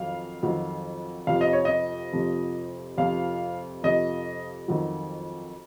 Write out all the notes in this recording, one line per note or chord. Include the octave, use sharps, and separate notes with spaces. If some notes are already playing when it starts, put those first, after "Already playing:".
Already playing: F2 D#3 F#3 F5
F2 D#3 F#3
F2 C3 F3 F5
D#5
C#5
D#5
F2 C3 F3
F2 C3 F3 F5
F2 C3 F3 D#5
F2 D#3 F#3